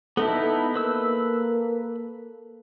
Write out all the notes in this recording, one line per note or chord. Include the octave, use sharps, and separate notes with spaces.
B3 D#4 E4 A4
A#3 B4 E6